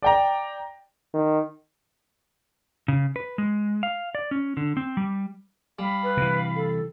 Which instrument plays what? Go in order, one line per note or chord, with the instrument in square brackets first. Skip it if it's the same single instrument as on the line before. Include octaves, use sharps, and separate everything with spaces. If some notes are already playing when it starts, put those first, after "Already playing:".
[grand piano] D5 G5 A#5
[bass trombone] D#3
[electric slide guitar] C#3
B4
G#3
F5
D5
C#4
D3
C4
G3
[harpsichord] G3 [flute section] F5 B5
[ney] B4
[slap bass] C3 E3
[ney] A4